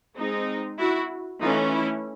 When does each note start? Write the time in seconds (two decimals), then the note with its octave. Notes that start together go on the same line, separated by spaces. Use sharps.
0.16 G#3 C4 D#4
0.79 E4 F#4
1.41 E3 A3 C#4 D#4 F4
1.73 E4